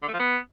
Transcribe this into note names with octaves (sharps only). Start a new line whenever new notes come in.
D3
A3
F3
B3